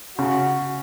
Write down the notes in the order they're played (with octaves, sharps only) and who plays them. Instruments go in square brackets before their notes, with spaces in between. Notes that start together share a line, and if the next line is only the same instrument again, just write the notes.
[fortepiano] C#3 [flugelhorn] F#4